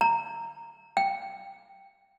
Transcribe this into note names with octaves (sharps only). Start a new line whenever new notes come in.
A#5
G5